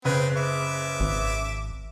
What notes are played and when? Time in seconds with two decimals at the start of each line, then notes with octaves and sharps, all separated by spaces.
0.05 F#1 C#3 C4 B4
0.37 E5 D6
1.00 G#1